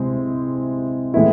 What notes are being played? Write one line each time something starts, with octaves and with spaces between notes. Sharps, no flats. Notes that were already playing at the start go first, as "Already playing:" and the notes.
Already playing: C3 G#3 C4 E4
A2 E3 G#3 B3 E4